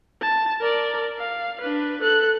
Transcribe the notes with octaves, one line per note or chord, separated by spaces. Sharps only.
A5
A#4 D5
F5
D4 B4
A4 F#6